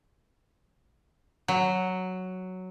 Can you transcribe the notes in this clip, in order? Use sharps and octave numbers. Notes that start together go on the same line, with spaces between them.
F#3